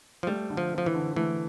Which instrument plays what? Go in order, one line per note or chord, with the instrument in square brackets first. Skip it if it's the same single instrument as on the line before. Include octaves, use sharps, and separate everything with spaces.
[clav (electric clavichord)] F3
[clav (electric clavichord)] G3 [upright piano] A3
[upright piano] D3
[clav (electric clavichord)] F3
[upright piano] C4
[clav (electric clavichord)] F3
E3
[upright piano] D3
[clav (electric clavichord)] E3 [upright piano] A3